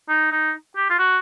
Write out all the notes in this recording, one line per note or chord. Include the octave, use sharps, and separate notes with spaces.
D#4
D#4
G4
F4
F#4